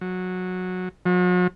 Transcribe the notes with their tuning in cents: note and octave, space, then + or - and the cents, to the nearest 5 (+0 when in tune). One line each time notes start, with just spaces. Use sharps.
F#3 -15
F#3 -45